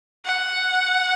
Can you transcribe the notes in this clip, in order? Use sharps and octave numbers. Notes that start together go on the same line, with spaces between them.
F#5